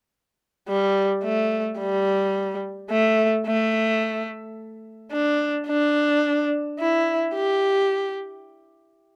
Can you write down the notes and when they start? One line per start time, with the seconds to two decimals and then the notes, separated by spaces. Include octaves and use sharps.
0.69 G3
1.24 A3
1.80 G3
2.91 A3
3.47 A3
5.12 D4
5.68 D4
6.79 E4
7.34 G4